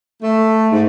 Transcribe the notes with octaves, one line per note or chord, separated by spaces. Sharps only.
A3
G#2